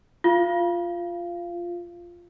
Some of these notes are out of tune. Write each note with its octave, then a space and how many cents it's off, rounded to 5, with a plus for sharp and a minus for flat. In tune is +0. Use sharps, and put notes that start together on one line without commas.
F4 +0 F5 -20